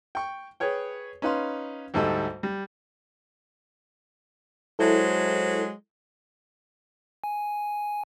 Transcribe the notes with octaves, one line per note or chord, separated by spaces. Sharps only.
G5 C#6
G#4 B4 C#5 G5
C#4 D#4 B4 F5 C6
D2 G#2 G3 A4 D#5
G3
F#3 G#3 E4 A4 C5
G#5